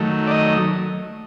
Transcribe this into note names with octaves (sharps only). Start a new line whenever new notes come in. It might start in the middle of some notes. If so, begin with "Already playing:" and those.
Already playing: D#3 F#3 A3
D5
D#5